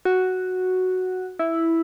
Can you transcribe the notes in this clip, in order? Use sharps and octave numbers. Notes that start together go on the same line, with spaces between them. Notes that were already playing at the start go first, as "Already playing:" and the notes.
F#4
E4